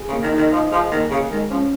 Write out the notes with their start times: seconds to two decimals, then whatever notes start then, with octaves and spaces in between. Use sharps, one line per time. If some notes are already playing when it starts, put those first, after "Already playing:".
Already playing: G#4
0.08 C#3
0.12 A#3
0.22 D#3
0.32 D#4
0.37 D#3
0.51 F3 D#5
0.72 F3 G#4
0.92 D#3 A#3
1.11 C#3 G#4
1.31 D#3 G#3
1.50 F3 C#4